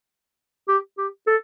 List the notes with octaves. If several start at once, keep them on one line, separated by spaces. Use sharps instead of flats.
G4
G4
A4